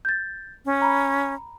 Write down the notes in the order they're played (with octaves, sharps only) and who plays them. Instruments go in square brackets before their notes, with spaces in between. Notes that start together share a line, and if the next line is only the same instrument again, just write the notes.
[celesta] G6 A6
[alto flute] C#4
[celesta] A#5 B5